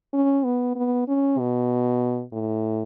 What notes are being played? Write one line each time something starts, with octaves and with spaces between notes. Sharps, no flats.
C#4
B3
B3
C#4
B2
A2